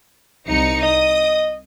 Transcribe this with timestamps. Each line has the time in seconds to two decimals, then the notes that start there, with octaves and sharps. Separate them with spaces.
0.48 C2 D#4 C#7
0.83 D#5 D#6